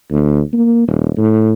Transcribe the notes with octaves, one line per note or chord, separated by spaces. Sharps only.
D2
A#3
D#1
A2